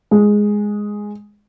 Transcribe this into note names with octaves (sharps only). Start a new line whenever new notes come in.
G#3